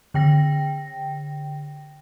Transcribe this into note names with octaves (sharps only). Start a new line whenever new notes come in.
D3 G5 A#6